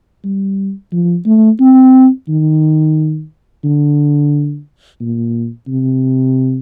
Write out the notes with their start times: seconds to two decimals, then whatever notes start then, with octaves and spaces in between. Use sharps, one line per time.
0.24 G3
0.92 F3
1.26 A3
1.60 C4
2.28 D#3
3.64 D3
5.01 A#2
5.67 C3